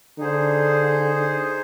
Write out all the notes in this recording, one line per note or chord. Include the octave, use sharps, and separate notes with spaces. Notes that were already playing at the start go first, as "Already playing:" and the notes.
D3 D#4 G#4 C5